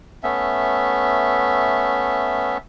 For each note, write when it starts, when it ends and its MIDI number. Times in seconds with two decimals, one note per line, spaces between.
0.23 2.58 57
0.23 2.58 59
0.23 2.58 61
0.23 2.58 76